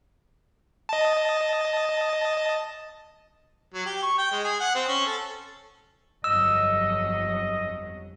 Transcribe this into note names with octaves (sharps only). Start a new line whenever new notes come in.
D#5 A5
F#3
G4
C#6
G5
G#3
G#4
F#5
C4
C#4
A4
G1 F2 F#3 D#5 E6